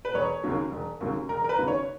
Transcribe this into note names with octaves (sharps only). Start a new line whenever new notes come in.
B4
E1 C#5
D#2 C#3 F#3
E1
D#2 C#3 F#3
E1 A#4
A#4
B4
D#2 C#3 F#3
C#5